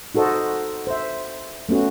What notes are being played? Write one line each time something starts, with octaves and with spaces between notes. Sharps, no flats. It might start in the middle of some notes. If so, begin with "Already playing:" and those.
D#4 F#4 A4 C5 D#5
C5 E5
A3 B3 C#4 F#4